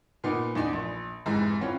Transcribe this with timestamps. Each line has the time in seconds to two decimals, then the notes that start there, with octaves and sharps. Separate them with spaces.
0.24 A#2 B3 D#4
0.55 E2 D4 D#4
0.73 A#1
1.26 F1 G#2 E3 A#5
1.61 E3 C4 C#4 F4